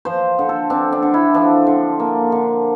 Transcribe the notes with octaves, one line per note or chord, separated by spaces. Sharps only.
F3 C5
D3
A4
C4 D4
D4
D3
E4
F3 D4
D3
A#3
D3